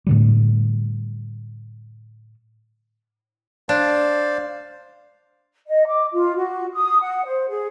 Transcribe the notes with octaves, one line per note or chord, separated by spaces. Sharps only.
A2 D3 G3
D4 C5 D5 F5
D#5
D6
F4
F#4
D#6
F#5
C5
G#4